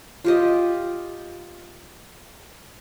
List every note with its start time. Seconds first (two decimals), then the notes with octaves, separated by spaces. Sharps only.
0.24 F4 G4 D#5